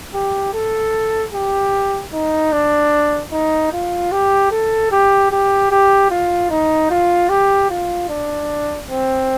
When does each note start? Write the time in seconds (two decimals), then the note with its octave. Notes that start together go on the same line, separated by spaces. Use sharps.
0.14 G4
0.54 A4
1.33 G4
2.13 D#4
2.52 D4
3.32 D#4
3.72 F4
4.12 G4
4.51 A4
4.92 G4
5.32 G4
5.71 G4
6.10 F4
6.50 D#4
6.90 F4
7.29 G4
7.70 F4
8.09 D4
8.89 C4